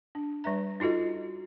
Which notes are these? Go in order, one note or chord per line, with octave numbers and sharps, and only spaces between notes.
D4
G3 B4 E5 A#5
D#4 F4 F#4 A4 D#5